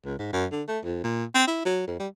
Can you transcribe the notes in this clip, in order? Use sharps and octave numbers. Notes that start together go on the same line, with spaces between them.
C#2
G#2
F#2
D3
A3
F2
A#2
C4
E4
F#3
F2
G3